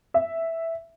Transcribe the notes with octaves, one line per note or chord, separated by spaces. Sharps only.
E5